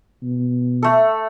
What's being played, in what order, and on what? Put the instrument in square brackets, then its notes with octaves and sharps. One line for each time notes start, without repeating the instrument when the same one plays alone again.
[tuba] B2
[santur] A3 A4